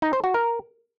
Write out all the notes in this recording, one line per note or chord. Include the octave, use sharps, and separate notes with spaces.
D#4
C5
F#4
A#4